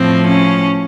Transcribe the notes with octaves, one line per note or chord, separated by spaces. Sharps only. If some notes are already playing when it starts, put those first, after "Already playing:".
Already playing: A2 F3 C4
C#4